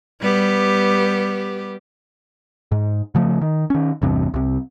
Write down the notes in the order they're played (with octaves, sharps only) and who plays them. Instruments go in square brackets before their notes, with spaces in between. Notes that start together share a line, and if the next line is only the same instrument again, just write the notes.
[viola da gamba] G3 B3 G4
[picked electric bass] G#2
C#3 F3 A3
D#3
D#3 C#4
A1 E2 G2 C3
C2 C3